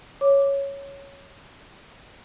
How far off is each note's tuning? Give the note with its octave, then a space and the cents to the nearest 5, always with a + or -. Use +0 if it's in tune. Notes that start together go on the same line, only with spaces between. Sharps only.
C#5 +0 D6 +0